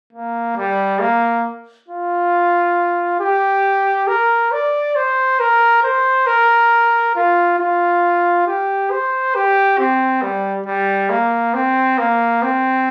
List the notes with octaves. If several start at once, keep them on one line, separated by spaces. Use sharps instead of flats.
A#3
G3
A#3
F4
G4
A#4
D5
C5
A#4
C5
A#4
F4
F4
G4
C5
G4
C4
G3
G3
A#3
C4
A#3
C4